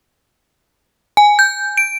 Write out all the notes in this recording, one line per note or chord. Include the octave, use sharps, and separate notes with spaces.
G#5
G6
D7